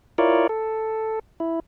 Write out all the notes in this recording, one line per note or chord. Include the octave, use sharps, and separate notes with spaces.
E4 F4 A#4 C#5 D5
A4
E4